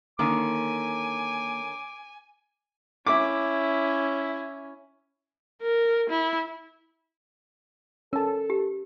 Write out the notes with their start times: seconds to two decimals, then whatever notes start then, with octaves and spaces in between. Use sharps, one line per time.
0.19 D3 D#3 A#3 C#4 G#5 D6
3.07 C#4 E4 D6
5.62 A#4
6.10 E4
8.13 C#4 A4 A#4 A5
8.50 G4